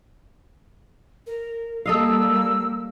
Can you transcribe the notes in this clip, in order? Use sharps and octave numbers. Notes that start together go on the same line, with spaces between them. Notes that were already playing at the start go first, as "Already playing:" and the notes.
A#4
G3 A#3 A4 D#5 F5 E6